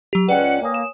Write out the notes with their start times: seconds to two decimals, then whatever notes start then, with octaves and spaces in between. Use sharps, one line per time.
0.13 F#3 G4
0.29 C#2 C#4 B4 D5 F#5 G5
0.61 A#3 C#5 G#5 D#6
0.74 E7